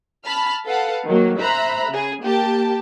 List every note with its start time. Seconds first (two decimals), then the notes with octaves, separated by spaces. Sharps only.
0.24 A5 B5 F6
0.65 A4 B4 F5 F#5 A5
1.06 D#3 F#3 A#3
1.40 C5 E5 A#5 B5 F#6
1.89 C#3 G#4
2.22 A#3 G4 A5